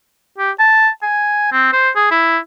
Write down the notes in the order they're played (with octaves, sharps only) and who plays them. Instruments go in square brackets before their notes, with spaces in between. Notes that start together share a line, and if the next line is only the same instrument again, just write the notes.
[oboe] G4
A5
G#5
C4
C5
G#4
E4